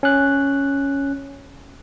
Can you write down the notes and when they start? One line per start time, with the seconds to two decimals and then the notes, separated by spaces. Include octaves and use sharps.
0.03 C#4 F#6